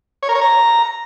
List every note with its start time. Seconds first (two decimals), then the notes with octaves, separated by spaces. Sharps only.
0.23 C#5
0.29 A#4
0.35 C#5
0.41 A#5